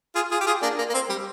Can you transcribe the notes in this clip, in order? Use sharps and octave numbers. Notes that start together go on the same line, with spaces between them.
F4 G#4
F4 G#4
G4
F4 G#4
A#3 D4
A#3
A#3
C4
G3